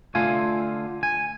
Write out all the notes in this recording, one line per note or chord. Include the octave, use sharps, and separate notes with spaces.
D3 A3 F4 F5 G#5
G#5